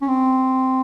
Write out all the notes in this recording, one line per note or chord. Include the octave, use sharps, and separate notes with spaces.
C#4
C4